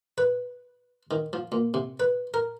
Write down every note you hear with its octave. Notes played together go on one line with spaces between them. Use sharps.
B4
D#3
F3
A#2
C3
B4
A#4